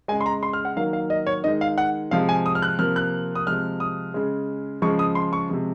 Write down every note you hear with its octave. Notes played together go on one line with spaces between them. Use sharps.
C#3 G#3 G#5
C6
A#5
C6
F6
F#5
D#3 F#3 A#3 F5
F5
D#5
C#5
D#3 G#3 D#5
F5
F#5
C3 F3 G#3 F5
G#5
D#6
F6
F#6
C3 F3 A#3 F6
F#6
D#6
C3 F3 G#3 F6
D#6
C#3 G#3
C#3 F3 G#3 C#6
D#6
C6
C#6
C3 F3 G#3